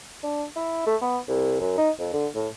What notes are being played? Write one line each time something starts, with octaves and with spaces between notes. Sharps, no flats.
D4
E4
A3
B3
C2
F#2
D#4
F2
D3
A2